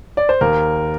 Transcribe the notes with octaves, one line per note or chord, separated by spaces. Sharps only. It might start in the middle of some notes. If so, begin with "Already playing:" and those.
D5
C5
D#2 A#4